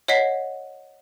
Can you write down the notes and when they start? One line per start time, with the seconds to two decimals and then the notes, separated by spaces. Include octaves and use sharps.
0.08 C#5 D#5 F#5 B6 C7